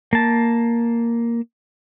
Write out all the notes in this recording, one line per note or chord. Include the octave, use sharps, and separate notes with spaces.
A#3 A5